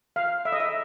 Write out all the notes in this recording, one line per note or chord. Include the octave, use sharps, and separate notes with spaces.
F5
E5
D#5
E5